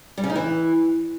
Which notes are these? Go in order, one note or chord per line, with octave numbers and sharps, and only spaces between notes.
G3
C#3
D#4
E3